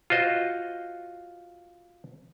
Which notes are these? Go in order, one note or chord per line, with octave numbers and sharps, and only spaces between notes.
F4 F#4 C5 D#5